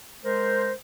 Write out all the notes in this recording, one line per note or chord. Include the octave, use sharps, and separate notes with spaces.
G#3 A#4 C5